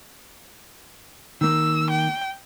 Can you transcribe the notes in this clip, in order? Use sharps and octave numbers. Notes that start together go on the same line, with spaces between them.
D#3 A#3 E6
G5